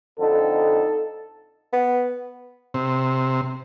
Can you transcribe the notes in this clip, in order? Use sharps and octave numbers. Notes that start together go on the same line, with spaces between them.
F2 D3 D#4 A4
B3
C3